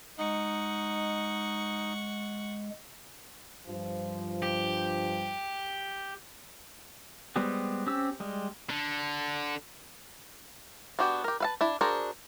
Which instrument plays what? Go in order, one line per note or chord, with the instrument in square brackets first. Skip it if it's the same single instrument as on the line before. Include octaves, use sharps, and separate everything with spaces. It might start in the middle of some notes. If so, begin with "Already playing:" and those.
[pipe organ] G#3 [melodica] D#4 [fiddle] F#5 C#6
[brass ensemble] G2 F3
[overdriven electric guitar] G4
[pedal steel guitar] G3 G#3 B3 C4
C4 C#4 G4 E6
G3 G#3
[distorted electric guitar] D3
[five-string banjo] B3 D4 F#4 G4
G4 A#4
B4 F5 A5
D4 E4
D4 F#4 G#4 A#4 C5